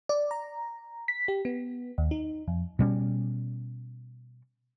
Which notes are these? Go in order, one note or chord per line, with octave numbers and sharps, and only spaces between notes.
D5
A#5
B6
G4
B3
D#2
D#4
F2
B2 G3 C#4